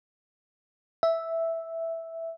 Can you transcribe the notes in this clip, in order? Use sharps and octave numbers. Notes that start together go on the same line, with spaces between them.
E5